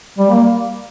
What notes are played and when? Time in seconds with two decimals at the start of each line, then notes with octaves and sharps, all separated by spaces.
0.18 G3
0.30 A#3